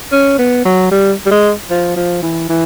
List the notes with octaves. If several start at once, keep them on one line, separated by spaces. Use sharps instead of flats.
C#4
B3
F#3
G3
G3
G#3
F3
F3
E3
E3